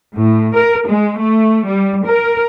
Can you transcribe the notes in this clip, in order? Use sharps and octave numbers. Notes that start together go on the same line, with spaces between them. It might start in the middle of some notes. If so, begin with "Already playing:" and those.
A2
A#4
G#3
A3
G3
A#4